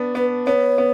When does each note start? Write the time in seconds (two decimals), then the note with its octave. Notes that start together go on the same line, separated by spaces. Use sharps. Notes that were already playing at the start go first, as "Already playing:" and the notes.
Already playing: B3 D4
0.15 B3 B4
0.46 B3 C#5
0.78 B3